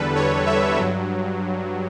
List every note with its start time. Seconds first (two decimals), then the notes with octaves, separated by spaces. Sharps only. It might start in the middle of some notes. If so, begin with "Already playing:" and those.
Already playing: E2 D3 G3 A4 B4
0.15 C#5
0.46 E5
0.77 G2 F#3